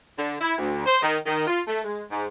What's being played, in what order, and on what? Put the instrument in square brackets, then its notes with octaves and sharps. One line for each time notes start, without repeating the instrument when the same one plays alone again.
[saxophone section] D3
E4
D2
C5
D#3
D#3
F4
A3
G#3
G#2